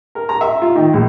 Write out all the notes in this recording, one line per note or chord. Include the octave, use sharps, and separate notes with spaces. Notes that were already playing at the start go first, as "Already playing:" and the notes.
A#4
A#5
E5
F4
D#3
A#1